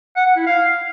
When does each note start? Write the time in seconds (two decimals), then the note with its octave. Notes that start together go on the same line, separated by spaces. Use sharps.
0.17 F#5
0.27 F#5
0.37 E4
0.47 F5